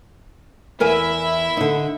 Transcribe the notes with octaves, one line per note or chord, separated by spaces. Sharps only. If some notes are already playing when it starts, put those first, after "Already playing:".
E2 E4 A#4 E5 G#5
D3 D#4